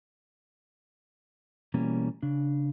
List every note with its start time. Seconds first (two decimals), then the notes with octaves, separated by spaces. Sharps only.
1.74 B2 E3 G3 A#3 C#4
2.22 C#3 D4